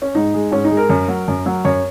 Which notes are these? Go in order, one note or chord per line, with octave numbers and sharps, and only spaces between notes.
C#4
G#2 D#4
G#3
G#2 C#4
D#4
G#3
A#4
F#2
F#3
F#2
F#3
F#2 C#5